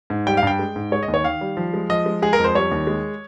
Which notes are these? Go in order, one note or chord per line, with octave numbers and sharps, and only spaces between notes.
G#2
G3 G5
F5
G2 G5
G#3
G#2
G#3 C#5
D#5
D#2
C#5
D#3 F5
G3
F3
G#3
F3 D#5
G#3
G#3 G#4
A#4
F2
C5
G3 C#5
D#2
G#3